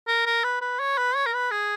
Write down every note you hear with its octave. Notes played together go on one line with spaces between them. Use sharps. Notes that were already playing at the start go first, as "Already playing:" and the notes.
A#4
A#4
B4
B4
C#5
B4
C#5
A#4
B4
G#4